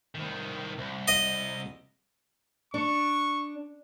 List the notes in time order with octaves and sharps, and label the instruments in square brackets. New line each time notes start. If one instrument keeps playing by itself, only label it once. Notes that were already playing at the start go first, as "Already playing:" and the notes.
[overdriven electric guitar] C2 D#3
C2
[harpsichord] D#5
[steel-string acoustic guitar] D4 [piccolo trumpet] C#6